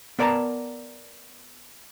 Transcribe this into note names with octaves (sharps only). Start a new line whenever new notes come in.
B3 A#4 D5 G5 A5 A#5